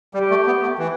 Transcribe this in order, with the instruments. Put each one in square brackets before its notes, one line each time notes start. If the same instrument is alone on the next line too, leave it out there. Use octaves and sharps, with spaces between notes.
[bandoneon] G3 [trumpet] G4
[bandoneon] A3
B3
A3
E3